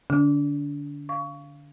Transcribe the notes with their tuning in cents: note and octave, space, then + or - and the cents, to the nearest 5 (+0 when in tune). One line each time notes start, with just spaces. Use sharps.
D3 +0 D4 -35
F5 -15 C#6 +20